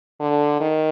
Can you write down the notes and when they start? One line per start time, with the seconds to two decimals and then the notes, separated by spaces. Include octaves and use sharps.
0.20 D3
0.60 D#3